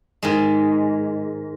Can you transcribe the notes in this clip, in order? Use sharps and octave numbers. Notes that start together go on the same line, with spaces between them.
G#2 D#3 G#3